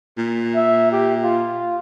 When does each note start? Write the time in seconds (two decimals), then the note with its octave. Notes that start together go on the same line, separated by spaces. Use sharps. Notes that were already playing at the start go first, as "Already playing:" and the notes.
0.18 A#2
0.56 E5
0.92 G4
1.24 F4